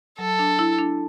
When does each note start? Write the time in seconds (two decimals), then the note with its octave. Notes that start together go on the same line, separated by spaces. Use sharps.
0.19 F#3 A4
0.39 D4
0.59 E4
0.78 D4